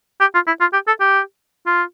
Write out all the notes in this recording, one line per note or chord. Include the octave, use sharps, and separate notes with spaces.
G4
F4
E4
F4
G4
A4
G4
F4